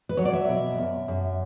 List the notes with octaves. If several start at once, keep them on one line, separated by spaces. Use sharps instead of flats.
B4
F#3 C#5
D5
E5
B2
F#2
F#2